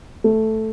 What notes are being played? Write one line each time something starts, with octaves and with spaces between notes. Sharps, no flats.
A3